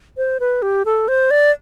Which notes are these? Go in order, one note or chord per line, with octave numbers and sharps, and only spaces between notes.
C5
B4
G4
A4
C5
D5